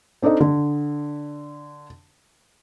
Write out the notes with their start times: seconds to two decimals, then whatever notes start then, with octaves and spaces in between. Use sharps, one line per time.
0.22 C4 D4 D#4 A4 D#5
0.40 D3